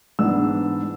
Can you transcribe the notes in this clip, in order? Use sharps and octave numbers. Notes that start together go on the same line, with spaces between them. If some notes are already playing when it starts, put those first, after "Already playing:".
G#2 E3 B3 D4 E6